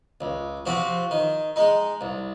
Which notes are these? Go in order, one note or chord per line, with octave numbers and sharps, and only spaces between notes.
C#2
C3 F3 C4 F#4
D#3
G#3 D#4
C2